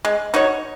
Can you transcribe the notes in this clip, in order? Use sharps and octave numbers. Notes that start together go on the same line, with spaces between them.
G#3
D#4 F#4 C#5